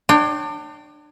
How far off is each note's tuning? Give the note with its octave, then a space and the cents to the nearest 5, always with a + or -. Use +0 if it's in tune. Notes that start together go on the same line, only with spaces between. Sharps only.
D4 +30 C#5 +0 G5 -15